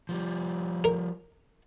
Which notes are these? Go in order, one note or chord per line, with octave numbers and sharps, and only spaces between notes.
F3 G3
A#4